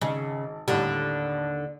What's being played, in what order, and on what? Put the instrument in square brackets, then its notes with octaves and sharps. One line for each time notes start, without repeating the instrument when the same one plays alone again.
[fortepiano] G#1 [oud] C#3
[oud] D#2 D3 [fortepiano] A2 G3